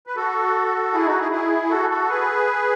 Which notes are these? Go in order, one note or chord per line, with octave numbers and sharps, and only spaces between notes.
B4
F#4 A4
E4 G#4
D#4 F#4
E4 G#4
E4 G#4
F#4 A4
F#4 A4
G#4 B4